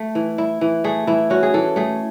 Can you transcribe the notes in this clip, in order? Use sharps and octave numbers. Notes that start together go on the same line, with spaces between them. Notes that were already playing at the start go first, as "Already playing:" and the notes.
Already playing: A3
E3
E4
E3
A3 G#4
E3 E4
C#4 F#4
G#4
E3 A4
A3 G#4